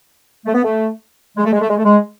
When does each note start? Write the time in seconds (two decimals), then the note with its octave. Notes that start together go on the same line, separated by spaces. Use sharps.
0.46 A3
0.55 B3
0.65 A3
1.37 G#3
1.45 A3
1.53 G#3
1.61 A3
1.70 G#3
1.77 A3
1.84 G#3